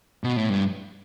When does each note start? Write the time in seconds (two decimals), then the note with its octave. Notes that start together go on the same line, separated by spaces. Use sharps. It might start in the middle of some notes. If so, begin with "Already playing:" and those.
0.24 B2
0.36 A2
0.50 G2